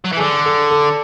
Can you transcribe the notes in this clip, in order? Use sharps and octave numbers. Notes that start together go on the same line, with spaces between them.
F#3
E3
G#4
D3 A4
A4
A4